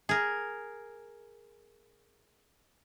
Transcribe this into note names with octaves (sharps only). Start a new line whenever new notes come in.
G#4 A#4